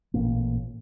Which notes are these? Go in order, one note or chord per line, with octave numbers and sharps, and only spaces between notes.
A1 A#2 A#3